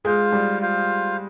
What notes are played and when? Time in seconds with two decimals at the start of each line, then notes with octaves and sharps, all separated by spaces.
0.05 G#3 F4 G#4 C5 F5
0.32 G3 G4
0.61 F4 C5 F5